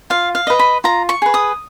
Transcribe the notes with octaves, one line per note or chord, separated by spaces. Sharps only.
F4 F5
F5
B4 D#5
B5
F4 A#5
C#6
G#4 B4
D#6